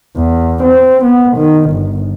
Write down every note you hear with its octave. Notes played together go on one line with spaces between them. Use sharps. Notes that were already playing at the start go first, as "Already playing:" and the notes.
E2
C4
B3
D#3
G1